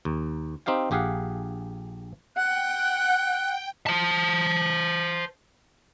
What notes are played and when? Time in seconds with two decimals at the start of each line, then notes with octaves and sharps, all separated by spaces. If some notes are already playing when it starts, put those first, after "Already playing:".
0.05 D#2
0.66 C4 D#4 G4 F5 G5
0.91 A#1 G4 G#4 F5 F#5
2.37 F#5 G5 F#6
3.87 C5 A5